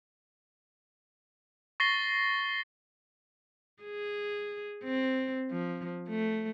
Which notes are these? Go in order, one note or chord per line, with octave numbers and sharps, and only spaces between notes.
C#6 A6 A#6 C7 G7
G#4
C4
F3
A3